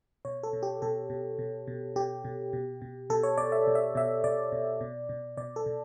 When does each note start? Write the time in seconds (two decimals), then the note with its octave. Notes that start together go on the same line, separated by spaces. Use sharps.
0.25 B2 C#5
0.43 A4
0.53 B2
0.63 G4
0.82 B2 A4
1.10 B2
1.39 B2
1.67 B2
1.96 B2 G4
2.24 B2
2.53 B2
2.82 B2
3.10 B2 A4
3.23 C#5
3.38 B2 D5
3.52 E5
3.67 B2
3.75 E5
3.95 B2 E5
4.24 B2 D5
4.52 B2
4.81 B2
5.09 B2
5.37 B2 D5
5.56 A4
5.66 B2